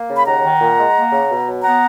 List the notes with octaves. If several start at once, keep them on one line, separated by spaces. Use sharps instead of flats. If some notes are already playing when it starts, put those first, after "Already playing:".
Already playing: A#3
C#3
B5
D#2 F#5 A#5
D#3
A#2
G#3
A#3
C#3
B2
F#3
B3 F#5 A#5